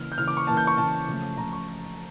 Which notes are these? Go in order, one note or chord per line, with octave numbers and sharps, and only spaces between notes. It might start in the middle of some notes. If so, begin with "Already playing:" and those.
Already playing: C#3 E3 A#3 F6
G6
C#3 E3 A#3 F6
D6
C#6
C#3 E3 A#3 A5
G6
C#6
C#3 E3 A#3 A5
C#3 F3 A3
C#3 F3 A3 A#5
C#6